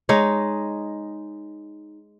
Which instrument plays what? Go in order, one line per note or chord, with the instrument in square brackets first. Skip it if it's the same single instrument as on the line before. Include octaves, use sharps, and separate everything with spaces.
[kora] G#3 D#4 C#5